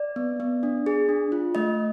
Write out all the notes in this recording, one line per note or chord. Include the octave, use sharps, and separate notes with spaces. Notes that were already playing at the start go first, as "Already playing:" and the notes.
Already playing: D5
B3
B3
D4
G#4
D4
F4
A3 D#5